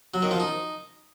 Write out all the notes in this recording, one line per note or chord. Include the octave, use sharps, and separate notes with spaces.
F#3
D#3
F3
D#4